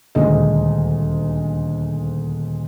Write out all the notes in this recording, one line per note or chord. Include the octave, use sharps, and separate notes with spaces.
D#1 D2 G#3 D#5